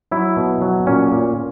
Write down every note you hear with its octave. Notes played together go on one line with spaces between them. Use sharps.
F#3 E4
B2
F#3
A#2 C#4
A#2